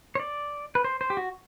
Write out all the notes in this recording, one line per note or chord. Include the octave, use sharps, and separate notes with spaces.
C#5
D5
B4
C5
C5
G4
F#4